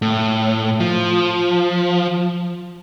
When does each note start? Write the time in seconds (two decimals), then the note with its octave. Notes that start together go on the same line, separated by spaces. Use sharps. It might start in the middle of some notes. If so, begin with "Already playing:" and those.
0.02 A2
0.81 F3